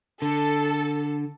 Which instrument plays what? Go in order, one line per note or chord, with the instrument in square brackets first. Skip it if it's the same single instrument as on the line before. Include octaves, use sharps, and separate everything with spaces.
[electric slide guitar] D3 [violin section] A4